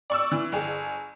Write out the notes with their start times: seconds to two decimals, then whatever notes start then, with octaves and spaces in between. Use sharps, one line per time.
0.10 D5 C#6 E6
0.32 E3
0.52 G1 G#4